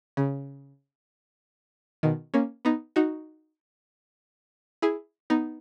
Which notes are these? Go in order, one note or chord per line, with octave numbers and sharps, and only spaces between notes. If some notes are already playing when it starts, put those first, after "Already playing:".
C#3
B2 D#3
A#3 C#4
B3 D#4
D#4 F#4
E4 G#4
B3 D#4